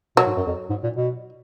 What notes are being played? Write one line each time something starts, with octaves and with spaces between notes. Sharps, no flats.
B2 F#3
G#2
F#2
F2
G#2
A#2
B2